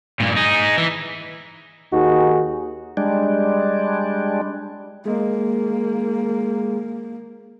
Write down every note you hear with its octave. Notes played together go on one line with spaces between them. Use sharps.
G2 A#2
D#4 G#4
E3
D#2 D#4 F#4 G#4
G3 G#3 D4
G#3 A#3